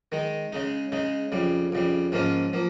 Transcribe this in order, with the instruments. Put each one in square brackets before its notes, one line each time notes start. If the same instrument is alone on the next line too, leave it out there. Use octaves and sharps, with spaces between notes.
[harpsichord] D#3 G#3 D#4
C#3 G#3 D#4
C#3 G#3 D#4
F2 C#3 G3
F2 C#3 G3
G#2 F3 A#3 C#4 F4
F3 A#3